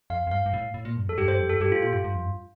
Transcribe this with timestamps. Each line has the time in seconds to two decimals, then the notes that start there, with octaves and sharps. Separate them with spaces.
0.10 F2 F5
0.27 F2
0.31 G2 F5
0.46 G2
0.54 A2
0.74 A2
0.85 A#2
0.97 G2
1.07 F2 A4
1.18 G2 G4
1.28 G2 C5
1.39 F2
1.50 G2 A4
1.60 G2 G4
1.71 A2 F4
1.82 A#2 F4
1.93 G2 F4
2.04 G2
2.14 F2
2.25 G2